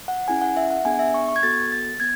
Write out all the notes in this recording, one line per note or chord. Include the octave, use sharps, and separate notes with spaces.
F#5
C#4 E4 G#4 G#5
F#5
E5
F#5
B3 D4 G#4 G#5
E5
C#6
C#6
G#6
B3 F#4 A4 A6
A6
B3 G#6